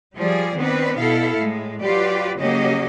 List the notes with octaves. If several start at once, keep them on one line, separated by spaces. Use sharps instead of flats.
F3 G3 G#4 D5
D#3 B3 C4 D4 B4
B2 E4 A4 F5
A2 G#3
F#3 F4 G4 B4 D5
C#3 F#3 A#3 C#4 G4 D#5